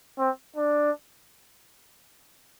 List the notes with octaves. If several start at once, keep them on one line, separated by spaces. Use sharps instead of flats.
C4
D4